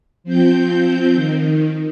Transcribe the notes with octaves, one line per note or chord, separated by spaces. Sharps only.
F3 C4 G6
D#3